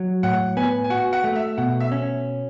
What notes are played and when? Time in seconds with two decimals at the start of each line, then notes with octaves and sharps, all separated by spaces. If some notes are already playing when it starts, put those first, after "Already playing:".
Already playing: F#3
0.23 A2 F#5
0.57 B3 G#5
0.84 G#5
0.90 F#4 F#5
1.13 F#5
1.24 A3
1.36 E5
1.58 B2 F#5
1.80 E5
1.92 C#4